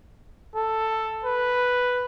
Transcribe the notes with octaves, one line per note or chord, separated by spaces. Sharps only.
A4
B4